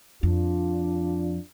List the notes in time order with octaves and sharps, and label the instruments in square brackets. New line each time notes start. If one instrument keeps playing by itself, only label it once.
[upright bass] F2 [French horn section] D4 F4